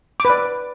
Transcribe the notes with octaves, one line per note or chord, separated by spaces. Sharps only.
D6
B4
D5